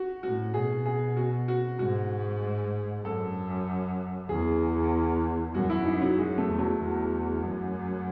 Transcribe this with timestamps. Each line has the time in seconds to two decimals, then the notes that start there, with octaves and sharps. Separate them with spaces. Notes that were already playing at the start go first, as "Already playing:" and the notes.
Already playing: F#4
0.23 A2 F#4
0.54 B2 G#4
0.86 G#4
1.17 F#4
1.48 F#4
1.79 G#2 F#4
3.05 F#2 A4
4.29 E2 G#4
5.54 F#2 F#4
5.70 E4
5.85 F#2 D#4
6.02 F#3
6.17 F#2 G#3
6.38 A3
6.48 E2
6.59 F#3
6.79 E2
7.42 F#2